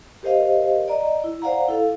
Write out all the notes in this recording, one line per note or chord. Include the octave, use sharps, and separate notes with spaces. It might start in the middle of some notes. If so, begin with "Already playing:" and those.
G4 A#4 C5 D#5 F5
D5 D#5 A#5
E4
C5 D5 F5 F#5 A#5
E4 A4 F5